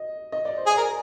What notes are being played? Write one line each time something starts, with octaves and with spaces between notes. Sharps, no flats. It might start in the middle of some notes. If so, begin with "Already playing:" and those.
Already playing: D#5
D#5
D5
C5
G#4
D5
A#4